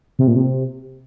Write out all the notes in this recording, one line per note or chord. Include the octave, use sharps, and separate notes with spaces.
C3
A#2
C3